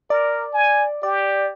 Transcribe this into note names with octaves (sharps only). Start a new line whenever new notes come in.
A#4 D5
G#5
G4 D5